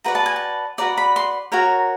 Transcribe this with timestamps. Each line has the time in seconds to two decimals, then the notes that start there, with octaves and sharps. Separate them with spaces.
0.04 F#4 B4 D5 A#5
0.15 A5
0.26 G#5
0.36 A5
0.78 F#4 B4 D5 A#5
0.97 B5
1.16 C6
1.52 F#4 A#4 C#5 A#5